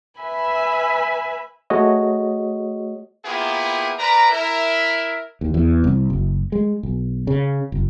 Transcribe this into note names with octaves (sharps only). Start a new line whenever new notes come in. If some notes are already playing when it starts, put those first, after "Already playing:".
B4 E5 G#5 B5
A3 F#4 G#4 C#5 D#5
A#3 B3 E4 F4 G4 G#4
A#4 B4 D5 A#5
E4 A#4 E5
D#2
E2
C2
F#1
G#3
B1
C#3
F#1